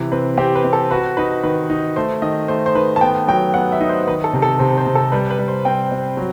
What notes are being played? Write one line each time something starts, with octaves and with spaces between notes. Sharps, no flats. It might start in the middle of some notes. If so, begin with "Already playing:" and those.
Already playing: C3 E3
C4 B4
C4 G4
B4
C4
A4
F#4 B4
D#4 B4
D#3 B4
D#4
A3 C5
D#3 D#5
A3 C5
C5
D#3 B4
A5
B3 G5
F#3 G5
B3 F#5
E5
D#4
C5
D#3 B4
A4
C3
A4
C3 C5
C5
C3
A4
G3 B4
B4
G3
C5
C4 G5
C4
F#3